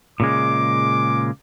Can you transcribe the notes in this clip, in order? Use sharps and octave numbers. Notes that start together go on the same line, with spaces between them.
A#2 C#3 G#3 D6